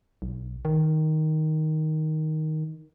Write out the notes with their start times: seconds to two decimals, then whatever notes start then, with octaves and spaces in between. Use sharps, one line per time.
0.22 B1
0.65 D#3